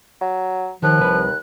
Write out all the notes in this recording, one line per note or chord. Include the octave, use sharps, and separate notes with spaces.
F#3
D#2 D#3 F3 F#6
C2 B4